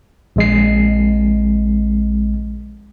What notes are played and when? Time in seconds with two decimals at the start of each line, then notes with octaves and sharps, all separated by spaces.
0.36 A#1 G#3 C7